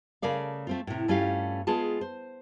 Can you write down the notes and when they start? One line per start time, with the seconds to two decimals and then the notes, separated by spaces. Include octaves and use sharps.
0.22 C#3 A3 A#4 D5 F5
0.67 A3 C4 F4
0.87 A2 C3
1.08 G2 A3 C#4 F4 G4 F5
1.67 G#3 B3 F4 G#4 A5
2.01 C5